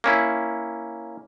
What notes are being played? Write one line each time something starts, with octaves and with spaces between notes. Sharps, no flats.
A#3 C#4 E4